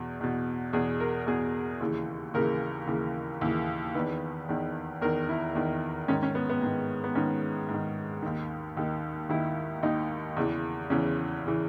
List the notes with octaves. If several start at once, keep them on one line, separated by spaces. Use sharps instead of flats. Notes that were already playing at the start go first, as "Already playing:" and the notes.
Already playing: E2 B2
E2 B2
E2 B2 G#4
A#4
E2 B2 G#4
D#2 C#3 E3
D#2 C#3 E3 A#4
D#2 C#3 E3
D#2 C#3 E3
E2 D#3 B4
E2 D#3
E2 D#3 A#4
E4
E2 D#3
G#2 D#3 C#4
C#4
B3
B3
G#2 D#3
B3
G#2 D#3 C#4
G#2
D#3
D#2 D#3
D#2 D#3
D#2 D#3 E4
D#2 D#3 D#4
E2 C#3 E3
E2 C#3 E3 C#4
C#3 E3